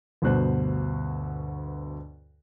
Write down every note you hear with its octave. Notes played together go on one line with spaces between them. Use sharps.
D2 G2 B2 C5 F#6